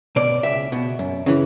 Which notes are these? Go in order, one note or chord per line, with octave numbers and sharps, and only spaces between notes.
B2 D5
C#2 E5
B2
F#2
C#3 E3